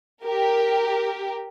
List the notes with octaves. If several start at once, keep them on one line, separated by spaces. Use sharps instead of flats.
G4 A#4